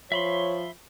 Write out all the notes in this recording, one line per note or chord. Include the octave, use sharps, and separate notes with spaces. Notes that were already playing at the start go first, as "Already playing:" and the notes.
F3 C#5 E5 B5 C6